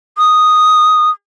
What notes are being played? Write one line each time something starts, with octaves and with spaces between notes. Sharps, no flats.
D#6